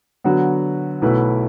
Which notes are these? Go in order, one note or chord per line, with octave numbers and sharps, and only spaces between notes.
D3 F#3 B3 F#4
B1 B2 A3 E4 B4